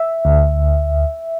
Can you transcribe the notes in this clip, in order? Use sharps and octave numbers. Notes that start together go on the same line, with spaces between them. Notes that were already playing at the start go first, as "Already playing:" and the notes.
Already playing: E5
D2